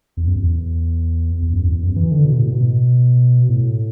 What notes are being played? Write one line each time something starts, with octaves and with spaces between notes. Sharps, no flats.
E2
F#2
E2
E2
F#2
E2
F#2
E3
D3
B2
A2
B2
A2